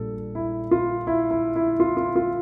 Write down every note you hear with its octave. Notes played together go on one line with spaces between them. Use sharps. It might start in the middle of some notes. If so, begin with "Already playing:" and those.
Already playing: A#1 A#2 G3 A4
E4
F4
E4
E4
E4
F4
F4
F4